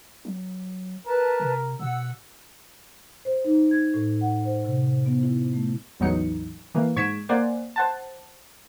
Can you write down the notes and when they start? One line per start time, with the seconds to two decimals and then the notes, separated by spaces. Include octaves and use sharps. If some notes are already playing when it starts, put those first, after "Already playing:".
0.25 F#3
1.06 A#4 B4 A5
1.40 C3
1.79 B2 F#5 E6
3.25 C5
3.45 D#4
3.71 G#6
3.94 A2
4.21 F#5
4.45 C5
4.65 C3
5.06 B3
5.23 E4
5.53 A3
6.00 A1 E2 F#3 D#4 C#7
6.75 E3 A#3
6.96 G#2 C#6 G#6 B6 D7 E7
7.29 A#3 C5 D5 F#5 G#5
7.76 C5 F#5 A5